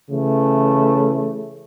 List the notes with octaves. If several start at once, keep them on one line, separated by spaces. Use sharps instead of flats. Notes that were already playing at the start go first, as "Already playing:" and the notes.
C#3 E3 A3